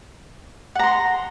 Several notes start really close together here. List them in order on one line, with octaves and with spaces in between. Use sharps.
F#5 A#5 C6